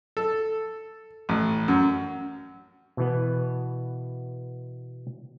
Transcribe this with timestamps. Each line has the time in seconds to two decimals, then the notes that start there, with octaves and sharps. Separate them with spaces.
0.17 A4
1.29 A1
1.68 F#2
2.97 B2 E3 B3